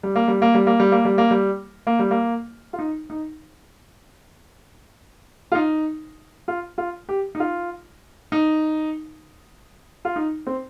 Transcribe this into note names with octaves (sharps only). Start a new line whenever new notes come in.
G3
A#3
G3
A#3
G3
A#3
G3
A#3
G3
A#3
G3
A#3
G3
A#3
F4
D#4
D#4
F4
D#4
F4
F4
G4
D#4
F4
D#4
F4
D#4
C4